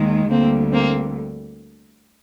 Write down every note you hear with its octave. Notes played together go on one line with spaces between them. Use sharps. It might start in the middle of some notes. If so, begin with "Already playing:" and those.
Already playing: D#2 D#3 G#3
D2 D3 G3 A#3 C4
A#3 C4